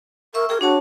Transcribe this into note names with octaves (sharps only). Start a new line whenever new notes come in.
A#4 E5 C#6 E6
G#4 A#4 G5
D4 F#4 C#5 A5